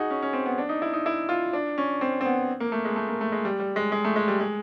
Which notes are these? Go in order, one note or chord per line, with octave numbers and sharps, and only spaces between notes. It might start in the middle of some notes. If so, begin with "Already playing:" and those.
Already playing: D#4 F#4 G#4
C#4
C#4
C4
B3
D4
D#4
E4
D#4
E4
F4
D4
C#4
C4
C4
B3
A#3
A3
G#3
A3
A#3
A3
G#3
G3
G3
G#3
G#3
A3
G#3
G3
G#3